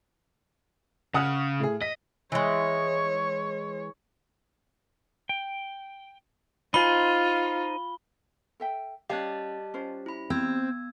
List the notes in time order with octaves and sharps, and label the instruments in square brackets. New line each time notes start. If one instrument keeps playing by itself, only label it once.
[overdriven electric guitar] C#3 [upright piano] F#5 D#6 F6
[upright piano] A2 G#4
[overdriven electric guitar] D#5 [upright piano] B6
[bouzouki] E3 G#3 [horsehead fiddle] C#5
[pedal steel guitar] G5
[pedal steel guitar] D#4 C5 G#5 [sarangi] F4 [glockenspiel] B5 G7
[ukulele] A4 E5 G5
[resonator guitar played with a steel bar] G3 G4 [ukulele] C#4 C#5 F5 [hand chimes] D#5 A5 F#6
[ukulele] C#4 F4 C5
[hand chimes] E4 B5
[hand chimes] B3 E6 G#6 [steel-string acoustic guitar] C4